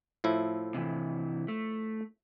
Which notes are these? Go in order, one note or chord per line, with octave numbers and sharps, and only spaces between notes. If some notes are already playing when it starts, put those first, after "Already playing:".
A2 F3 E4
C3 E3
A3